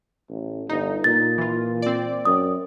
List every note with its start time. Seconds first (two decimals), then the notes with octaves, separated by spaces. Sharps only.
0.30 A1
0.69 G1 D#4
1.04 A#2 A6
1.38 E3 F4
1.82 C4 D5
2.25 F#2 D#6